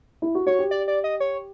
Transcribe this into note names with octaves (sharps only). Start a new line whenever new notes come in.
E4
F#4
F#4 C#5
G4
D5
D5
D#5
C#5